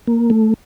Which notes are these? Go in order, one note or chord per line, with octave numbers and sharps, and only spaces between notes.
A#3
A3